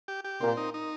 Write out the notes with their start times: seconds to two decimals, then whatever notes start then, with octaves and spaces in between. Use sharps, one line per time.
0.08 G4
0.24 G4
0.41 A#2 C4
0.57 D#4
0.74 D#4